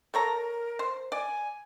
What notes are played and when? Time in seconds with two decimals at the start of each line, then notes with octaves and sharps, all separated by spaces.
0.14 A4 A#4 C#5 A#5
0.79 C5
1.12 D5 G#5